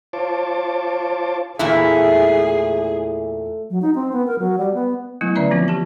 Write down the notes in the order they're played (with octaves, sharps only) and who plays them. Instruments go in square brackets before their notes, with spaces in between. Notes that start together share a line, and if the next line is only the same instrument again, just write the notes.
[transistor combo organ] F4 C5 C#5 A5 D6
[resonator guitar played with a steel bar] E2 A#2 E4 [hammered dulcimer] A3 [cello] G#4
[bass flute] F#3
D#4
C4
B3
A#4
F#3
G3
B3
[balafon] F#3 A3 B3 E4
D3 C#4 D5 E5 A#5
E3 F3 B3 C4 F4
F4 G4 A5